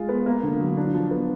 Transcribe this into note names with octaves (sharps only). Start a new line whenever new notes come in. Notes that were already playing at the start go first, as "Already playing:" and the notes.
Already playing: G#3 F4
B3
A#3
D3
F#3
D4
F3
B3